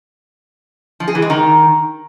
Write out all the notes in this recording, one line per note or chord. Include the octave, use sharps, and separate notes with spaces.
F3
G#4
E3
G#3
D#3